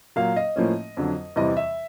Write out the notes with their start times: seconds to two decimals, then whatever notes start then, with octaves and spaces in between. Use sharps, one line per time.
0.16 A#2 F#3 A#3 F5
0.36 D#5
0.56 A2 F3 A#3 C#4
0.97 F2 D3 F#3
1.36 E2 C3 E3 G3 C4 D#5
1.57 E5